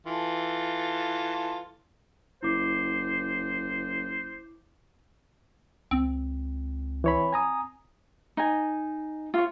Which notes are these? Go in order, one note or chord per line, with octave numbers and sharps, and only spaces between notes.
E3 F4 A4
F#1 E4 C5 D6
C#2 C4
E3 C#5 B5
G#5 A#5 D#6
D#4 G#5
F4 C#5